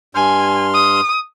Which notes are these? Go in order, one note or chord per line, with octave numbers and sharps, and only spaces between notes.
G2 G#5 C6 F6
D#6